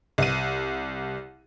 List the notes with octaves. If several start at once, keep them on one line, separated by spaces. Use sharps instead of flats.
C2 D#7